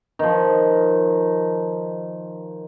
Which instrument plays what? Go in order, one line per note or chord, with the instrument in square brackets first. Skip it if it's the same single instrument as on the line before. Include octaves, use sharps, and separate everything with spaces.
[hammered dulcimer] D#3 F3